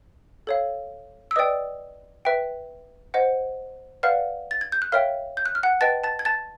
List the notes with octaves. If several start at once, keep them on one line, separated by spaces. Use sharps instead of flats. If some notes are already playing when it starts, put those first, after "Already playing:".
A4 C#5 F5
E6
B4 D5 D#5 G5 D#6
B4 E5 G5
C5 D#5 F#5
B4 D5 F5 F#5 F6
A6
G#6
G6
F#6
A#4 C#5 E5 F5 G5 F6
G6
F#6
F6
F#5 F#6
B4 D#5 G5 A5 A6
A5 A6
G#6
A5 A6